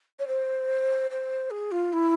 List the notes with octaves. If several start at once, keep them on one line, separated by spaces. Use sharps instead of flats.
C#5
C5
C5
G#4
F4
E4